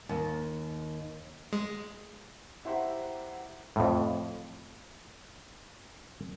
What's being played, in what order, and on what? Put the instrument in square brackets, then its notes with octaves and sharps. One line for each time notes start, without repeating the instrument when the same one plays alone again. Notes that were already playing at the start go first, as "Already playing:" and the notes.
[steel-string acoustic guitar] D#2
[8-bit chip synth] G#3
[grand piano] E4 G4 C5 F#5 A#5
[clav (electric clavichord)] F2 A2